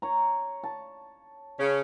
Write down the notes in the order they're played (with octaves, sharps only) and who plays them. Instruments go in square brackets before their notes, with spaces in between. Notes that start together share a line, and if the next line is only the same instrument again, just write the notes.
[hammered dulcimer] C#5 A#5
A5
[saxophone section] C#3 C#4